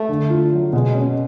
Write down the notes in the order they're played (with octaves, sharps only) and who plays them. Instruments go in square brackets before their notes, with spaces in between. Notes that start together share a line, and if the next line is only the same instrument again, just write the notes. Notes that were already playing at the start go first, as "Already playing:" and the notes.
Already playing: [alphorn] A3
[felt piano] D3
F4
F#3
[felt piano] B2 [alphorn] G#3
[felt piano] C#4